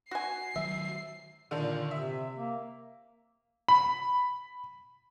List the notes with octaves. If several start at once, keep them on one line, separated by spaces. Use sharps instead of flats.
F#4 G#5 C7
D#3 F#3 E5
A#2 D3 D#3 D4
C3 E5
A#3
B5